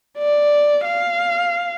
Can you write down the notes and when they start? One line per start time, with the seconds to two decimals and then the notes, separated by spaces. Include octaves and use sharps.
0.19 D5
0.85 F5